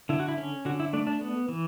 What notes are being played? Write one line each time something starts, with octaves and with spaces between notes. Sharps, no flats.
D3 E4
F#4
E4
C#4
D3 F#4
E4
A3 D4
D4
B3
E3